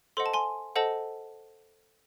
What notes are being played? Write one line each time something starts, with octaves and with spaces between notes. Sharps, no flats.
A4 C5 D#5 F#5 C6
A5
G#5 C6
A4 C5 D#5 F#5 A5